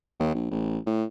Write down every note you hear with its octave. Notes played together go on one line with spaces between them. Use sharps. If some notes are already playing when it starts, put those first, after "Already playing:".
D#2
A#1
A1
A2